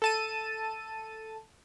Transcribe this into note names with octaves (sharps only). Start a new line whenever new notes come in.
A4 A5 D#7